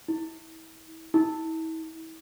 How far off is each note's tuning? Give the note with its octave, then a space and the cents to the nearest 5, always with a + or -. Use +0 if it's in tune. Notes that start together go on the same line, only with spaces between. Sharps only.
E4 -35
E4 -40